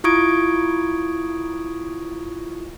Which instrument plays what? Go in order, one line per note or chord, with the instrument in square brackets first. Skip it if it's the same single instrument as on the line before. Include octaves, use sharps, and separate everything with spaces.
[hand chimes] E4 F4 C#6 D#6 G#6 D7